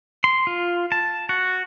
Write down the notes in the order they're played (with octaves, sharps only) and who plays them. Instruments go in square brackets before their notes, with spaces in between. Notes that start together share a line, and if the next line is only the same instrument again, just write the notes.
[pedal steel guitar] C6
F4
A5
F#4